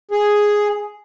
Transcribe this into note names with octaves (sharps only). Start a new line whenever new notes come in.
G#4